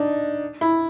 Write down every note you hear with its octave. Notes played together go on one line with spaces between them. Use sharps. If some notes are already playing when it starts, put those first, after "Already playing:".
Already playing: D4 D#4
E4